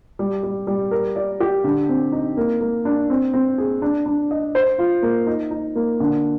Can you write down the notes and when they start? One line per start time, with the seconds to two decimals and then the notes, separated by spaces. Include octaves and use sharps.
0.19 G3
0.43 G3
0.67 G3
0.91 A#4
1.16 D5
1.40 G4
1.64 D3
1.89 C4
2.12 D#4
2.37 A#3
2.61 A#3
2.85 D4
3.10 C4
3.34 C4
3.58 G#4
3.82 D4
4.06 D4
4.31 D#5
4.55 C5
4.78 F4
5.02 A#3
5.27 D#4
5.51 D#4
5.76 A#3
6.00 D3